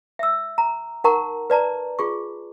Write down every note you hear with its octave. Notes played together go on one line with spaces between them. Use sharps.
E5 E6
A#5
D#4 A#4 F#5 A5 A#5 C#6
B4 D5 A5 A#5
F4 G#4 C#6